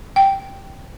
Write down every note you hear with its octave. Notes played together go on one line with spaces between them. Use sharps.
G5